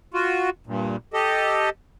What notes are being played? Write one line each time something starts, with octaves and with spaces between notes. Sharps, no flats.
F4 F#4
G2 A#2
G4 A4 D#5